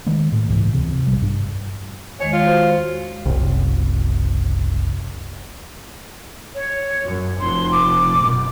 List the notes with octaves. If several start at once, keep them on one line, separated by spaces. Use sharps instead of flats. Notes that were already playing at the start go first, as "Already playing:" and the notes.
D#3 G#3 A#3
A2
C#2 G#2 C#3 E3
E2 C3
A#1 G3
G2 D4
E2 D#3 G#3 C#5
F4
F#4 C5
F#1 C2
C#5
F#2
F1 C6
D6
F#2 B2